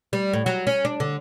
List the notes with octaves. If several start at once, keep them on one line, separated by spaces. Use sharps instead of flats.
G3
A2
F#3
C#4
D4
D3